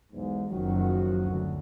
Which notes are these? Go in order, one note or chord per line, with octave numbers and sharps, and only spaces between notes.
B1 E2 G#2
F#1 D#3 F3 F#3 F#4
D2